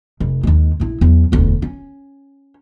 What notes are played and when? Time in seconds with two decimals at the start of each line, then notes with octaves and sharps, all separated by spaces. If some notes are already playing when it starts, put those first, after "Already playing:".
0.20 F1
0.43 D#2 G#3
0.80 A#1 E4
1.01 E2 F#3
1.32 E1 D2
1.62 C#4